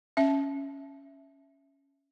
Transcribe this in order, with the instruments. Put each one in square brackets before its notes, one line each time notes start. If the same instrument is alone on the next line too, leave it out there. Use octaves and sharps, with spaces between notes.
[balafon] C#4 E5